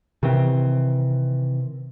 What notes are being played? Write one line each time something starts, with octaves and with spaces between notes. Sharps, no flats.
C3 D#3 E3 C4